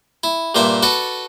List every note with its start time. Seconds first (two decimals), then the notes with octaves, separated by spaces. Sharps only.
0.24 E4
0.55 G2 A#2 C5 E5 D6
0.83 F#4 A4 B4 D5